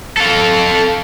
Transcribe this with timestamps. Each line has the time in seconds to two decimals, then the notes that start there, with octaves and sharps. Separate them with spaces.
0.18 A4 F5